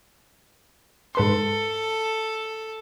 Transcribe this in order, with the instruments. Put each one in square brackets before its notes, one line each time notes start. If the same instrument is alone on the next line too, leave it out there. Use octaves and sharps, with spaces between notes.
[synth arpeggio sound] G#2 B4 C6 [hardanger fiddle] A4